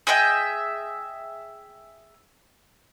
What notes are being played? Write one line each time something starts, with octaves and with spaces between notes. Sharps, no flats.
G#4 D#5 E5 G5